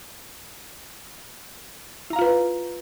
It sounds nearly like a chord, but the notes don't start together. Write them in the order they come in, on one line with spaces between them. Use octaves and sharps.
E4 A#5 F5 F4 B4